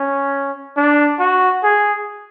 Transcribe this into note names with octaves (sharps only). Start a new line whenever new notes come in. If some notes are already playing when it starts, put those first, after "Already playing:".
Already playing: C#4
D4
F#4
G#4